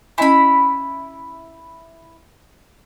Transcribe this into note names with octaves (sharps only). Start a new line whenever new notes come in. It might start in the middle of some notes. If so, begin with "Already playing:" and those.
C#4 E4 D#5 G#5 B5